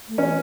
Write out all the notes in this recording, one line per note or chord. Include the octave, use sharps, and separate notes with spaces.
A3
E3 C#4